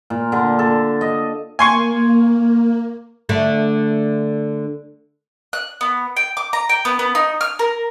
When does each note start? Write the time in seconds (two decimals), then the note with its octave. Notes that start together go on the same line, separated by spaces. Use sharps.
0.10 A#2
0.32 D3
0.59 A4
1.01 D#5
1.59 A#3 G#5 C6 C#6
3.29 D3 A3 D4
5.53 F#6
5.81 B3
6.17 G5
6.37 D6
6.53 A#5
6.69 G5
6.85 B3
6.99 B3
7.15 D#4
7.41 F6
7.59 A#4